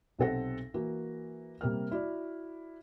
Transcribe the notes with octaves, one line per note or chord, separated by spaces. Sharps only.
B1 C3 C4 A4 F#5 A#6
E3 A#3 F#4
C3 G3 A#3 F6
E4 F#4 D5